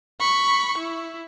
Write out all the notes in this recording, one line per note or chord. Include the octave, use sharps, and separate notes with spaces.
B5 C#6
E4